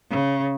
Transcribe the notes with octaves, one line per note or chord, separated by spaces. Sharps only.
C#3